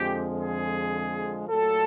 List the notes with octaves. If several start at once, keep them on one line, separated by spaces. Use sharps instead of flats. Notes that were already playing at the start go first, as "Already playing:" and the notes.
Already playing: F2 D3 F3 G#3 G4
G#4
A#2 F#3 A3 A4